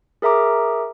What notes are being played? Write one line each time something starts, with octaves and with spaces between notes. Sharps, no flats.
G#4 A#4 E5 A#5 D6